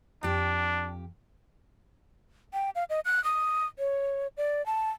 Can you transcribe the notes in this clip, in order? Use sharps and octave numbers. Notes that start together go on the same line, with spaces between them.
F2 D4 G4
G5
F5
D#5
F#6
D#6
C#5
D5
A5